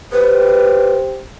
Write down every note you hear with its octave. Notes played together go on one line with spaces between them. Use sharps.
G4 B4 C5